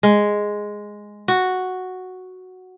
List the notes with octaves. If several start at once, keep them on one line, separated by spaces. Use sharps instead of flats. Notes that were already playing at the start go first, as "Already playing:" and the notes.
G#3
F#4